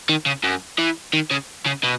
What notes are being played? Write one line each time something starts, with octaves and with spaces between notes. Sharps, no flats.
D#3
C#3
F#2
E3
D#3
C#3
C#3
B2